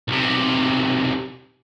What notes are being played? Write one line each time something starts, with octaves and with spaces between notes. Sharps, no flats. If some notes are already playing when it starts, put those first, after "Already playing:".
B1 C3